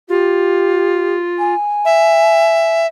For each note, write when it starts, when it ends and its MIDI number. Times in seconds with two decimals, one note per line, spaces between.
0.09 1.55 65
0.09 1.15 67
1.39 2.82 80
1.85 2.87 76